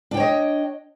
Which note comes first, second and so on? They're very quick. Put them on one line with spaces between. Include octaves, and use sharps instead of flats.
D4 G5 C#5 D#5